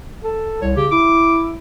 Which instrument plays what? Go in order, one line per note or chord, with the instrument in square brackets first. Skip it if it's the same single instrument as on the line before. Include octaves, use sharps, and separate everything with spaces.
[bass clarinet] A4
[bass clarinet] C2 [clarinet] C#5
[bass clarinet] C#3 [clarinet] G4
[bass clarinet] E4 [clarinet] D6